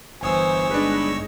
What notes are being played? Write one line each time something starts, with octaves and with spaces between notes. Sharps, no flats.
G1 E3 C5 C#5 G#5 D#6 E6
G#3 D4 D#4 B4